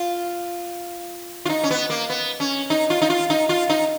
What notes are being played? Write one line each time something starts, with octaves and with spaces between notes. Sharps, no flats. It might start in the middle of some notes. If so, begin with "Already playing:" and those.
Already playing: F4
F4
D#4
C#4
B3
A#3
B3
C#4
D#4
F4
D#4
F4
D#4
F4
D#4